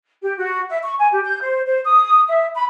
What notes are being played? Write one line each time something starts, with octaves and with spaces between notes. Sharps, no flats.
G4
F#4
E5
C#6
G#5
G4
G6
C5
C5
D#6
E5
B5